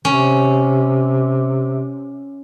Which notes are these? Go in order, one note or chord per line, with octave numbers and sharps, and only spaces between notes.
C3 C#4